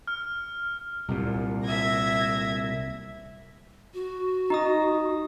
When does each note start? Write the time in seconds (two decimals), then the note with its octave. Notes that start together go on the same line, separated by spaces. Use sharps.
0.07 F6
1.08 C2 A#2
1.64 E5 G#6 A#6
3.94 F#4
4.50 D#4 D#5 D#6